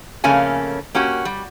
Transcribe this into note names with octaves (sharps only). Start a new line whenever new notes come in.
F2 C#3 A3 A#3 C#4 G#5
A#3 C#4 F#4 G4
G3